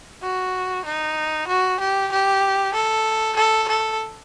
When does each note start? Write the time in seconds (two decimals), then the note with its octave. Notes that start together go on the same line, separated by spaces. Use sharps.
0.22 F#4
0.85 D#4
1.48 F#4
1.80 G4
2.12 G4
2.74 A4
3.37 A4
3.69 A4